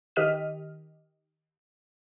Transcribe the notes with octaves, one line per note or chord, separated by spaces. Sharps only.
D#3 G4 D#5 F6 B6 D#7